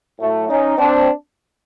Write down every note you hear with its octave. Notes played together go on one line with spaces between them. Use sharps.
A2 F#3 A3
C#4 D#4
C4 D4